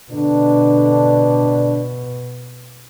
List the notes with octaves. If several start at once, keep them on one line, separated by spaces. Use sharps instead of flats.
B2 D3 D4